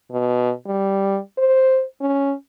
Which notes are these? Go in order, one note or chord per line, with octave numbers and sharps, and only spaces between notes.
B2
G3
C5
C#4